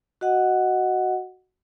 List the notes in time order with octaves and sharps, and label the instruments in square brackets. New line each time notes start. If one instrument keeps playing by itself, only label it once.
[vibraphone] F#4 D#5 F#5